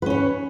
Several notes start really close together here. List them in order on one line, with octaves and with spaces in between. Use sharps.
B4 C#4 C#5